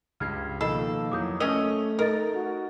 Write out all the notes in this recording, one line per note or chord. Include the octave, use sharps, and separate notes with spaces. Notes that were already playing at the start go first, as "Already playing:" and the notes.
C#2 G2 F6 G#6 C7
B2 D#3 F3 A#3 A4 D#5 B5 C7
F2 E3 F#3 D6 D#6 G6
A3 C#4 A#4 D#5 E6 C#7 F7 G7
D#4 A4 A#4 D#5 A6
F#4